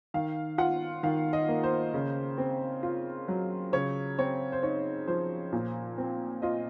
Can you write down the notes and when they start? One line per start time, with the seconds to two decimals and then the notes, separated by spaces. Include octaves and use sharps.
0.14 D#3 F5
0.58 F4 F#5
1.03 D#3 F5
1.33 D#5
1.48 A#3
1.63 C5
1.94 C#3
2.38 C4
2.83 F4
3.28 F#3
3.73 C#3 C#5
4.18 C4 C#5
4.52 C5
4.63 D#4 C#5
5.08 F3 C5
5.53 A#2
5.98 C4
6.42 F4 D#5